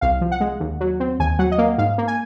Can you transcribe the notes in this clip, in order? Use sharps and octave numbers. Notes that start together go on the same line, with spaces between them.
C2 F5
F3
F#5
G#3
D#2
F#3
C4
D#2 G#5
F#3 F#5
D#5
A#3 F5
G#2 F5
A#3
G#5